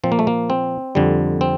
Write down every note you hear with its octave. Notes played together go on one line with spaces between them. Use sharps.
A#2 F3 C4
A#3
A3
A#3
C4
F2 D3 G3
C4